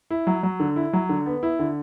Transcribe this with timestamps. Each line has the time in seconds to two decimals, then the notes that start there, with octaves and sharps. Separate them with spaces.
0.11 E4
0.27 F#3
0.43 F#3
0.60 D3
0.76 E4
0.93 F#3
1.09 D3
1.26 B3
1.43 E4
1.59 D3